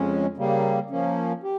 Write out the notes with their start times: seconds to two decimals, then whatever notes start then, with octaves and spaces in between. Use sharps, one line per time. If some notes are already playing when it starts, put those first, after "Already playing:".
Already playing: F2 C#3 G#3 C#4
0.37 C#3 G3 A#3
0.90 F3 A#3 C#4
1.43 G4